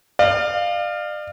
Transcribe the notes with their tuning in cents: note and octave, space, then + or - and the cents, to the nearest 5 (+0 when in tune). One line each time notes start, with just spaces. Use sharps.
D5 +40 F5 +0